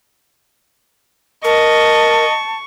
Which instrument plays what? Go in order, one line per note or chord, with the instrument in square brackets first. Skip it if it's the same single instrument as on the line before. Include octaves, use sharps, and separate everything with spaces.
[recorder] A#4 [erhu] D#5 [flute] A5 [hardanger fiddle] C#6